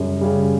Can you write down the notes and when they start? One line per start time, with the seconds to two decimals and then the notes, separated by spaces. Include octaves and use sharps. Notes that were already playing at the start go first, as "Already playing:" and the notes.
Already playing: F#2 C#3 G3
0.21 C#3 G3